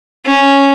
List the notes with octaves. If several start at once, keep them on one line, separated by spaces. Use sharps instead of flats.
C#4